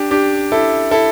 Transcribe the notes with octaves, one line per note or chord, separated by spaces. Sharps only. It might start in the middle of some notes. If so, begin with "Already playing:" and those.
Already playing: D4 G4
D4 G4
E4 A4
E4 A4